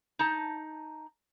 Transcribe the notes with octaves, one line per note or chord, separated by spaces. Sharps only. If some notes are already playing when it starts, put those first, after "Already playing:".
D#4 A5